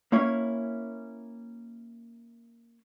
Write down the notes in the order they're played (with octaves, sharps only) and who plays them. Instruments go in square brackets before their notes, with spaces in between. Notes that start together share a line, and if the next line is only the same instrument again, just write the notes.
[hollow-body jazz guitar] A#3 C#4 E4 C#5